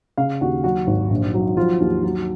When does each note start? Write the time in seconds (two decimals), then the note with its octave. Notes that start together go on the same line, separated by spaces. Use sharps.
0.17 C#3 F5
0.41 D#2 F#4
0.64 F#3 F#4
0.87 G#1
1.10 A#1
1.34 F#3
1.57 F3 F4
1.80 D#2
2.03 F#3